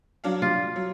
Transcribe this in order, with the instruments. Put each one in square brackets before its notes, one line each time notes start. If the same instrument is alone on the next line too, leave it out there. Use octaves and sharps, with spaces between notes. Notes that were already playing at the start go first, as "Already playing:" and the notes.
[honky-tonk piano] F#3 D4 F5
[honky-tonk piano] G3 [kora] F4
[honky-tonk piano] F#3